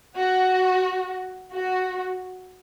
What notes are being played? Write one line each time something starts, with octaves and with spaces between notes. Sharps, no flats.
F#4
F#4